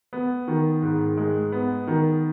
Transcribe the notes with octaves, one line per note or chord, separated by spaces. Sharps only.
B3
D#3
G#2
G#3
B3
D#3